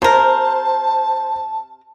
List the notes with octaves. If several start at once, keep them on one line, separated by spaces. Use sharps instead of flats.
C3 A#4 C5 A5